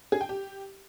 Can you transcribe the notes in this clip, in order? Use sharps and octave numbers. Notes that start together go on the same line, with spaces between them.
G#4
G5
G4